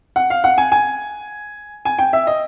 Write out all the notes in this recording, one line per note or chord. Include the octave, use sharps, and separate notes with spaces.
F#5
F5
F#5
G#5
G#5
G#5
G5
E5
D#5